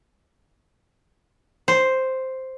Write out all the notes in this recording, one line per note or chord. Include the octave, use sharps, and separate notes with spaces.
C5